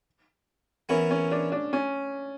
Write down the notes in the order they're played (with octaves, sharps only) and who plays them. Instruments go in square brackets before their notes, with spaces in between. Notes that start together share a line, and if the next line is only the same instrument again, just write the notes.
[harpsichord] E3 B3 E4 A#4 [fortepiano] C#4
[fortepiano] C#4
D4
D4
C#4